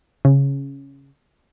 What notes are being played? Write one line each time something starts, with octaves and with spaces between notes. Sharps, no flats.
C#3